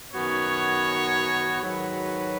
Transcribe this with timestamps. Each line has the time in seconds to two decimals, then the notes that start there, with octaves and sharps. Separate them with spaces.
0.14 F#2 D#3 B3 F#4 C#5
1.61 G#2 D#3 F#3 B4